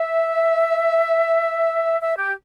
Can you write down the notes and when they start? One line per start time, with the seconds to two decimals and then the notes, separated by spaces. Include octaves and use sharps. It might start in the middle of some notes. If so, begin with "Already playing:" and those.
Already playing: E5
2.01 E5
2.17 G4